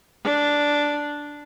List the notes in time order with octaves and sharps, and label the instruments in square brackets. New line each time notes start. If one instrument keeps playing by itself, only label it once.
[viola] D4